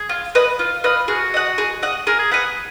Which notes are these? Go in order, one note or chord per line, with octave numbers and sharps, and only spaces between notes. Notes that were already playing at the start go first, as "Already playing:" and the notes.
Already playing: G#4
F4
B4 D#5
F4 F5
B4 D#5 F5
F#4 G#4
D#5 F#5
G#4
D#5 F#5
G#4 A#4
G#4
B4 D#5 F#5